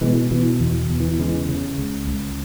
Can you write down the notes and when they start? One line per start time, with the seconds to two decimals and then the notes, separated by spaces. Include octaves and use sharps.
0.01 B2 E3 G#3
0.31 B2 E3
0.60 E2 E3
0.89 E2
1.00 E3
1.19 C#3 E3 G#3
1.49 C#3
1.78 C#2
2.08 C#2